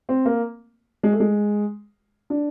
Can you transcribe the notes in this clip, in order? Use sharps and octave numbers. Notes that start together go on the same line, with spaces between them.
C4
A#3
G#3
A3
G#3
D4